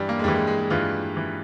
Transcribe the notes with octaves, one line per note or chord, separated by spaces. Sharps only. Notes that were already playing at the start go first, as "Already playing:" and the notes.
Already playing: G2 E3 G3
A#3
G#3
G2 E3 G3
G#3
G#3
G#3
G2 E3 F4
E3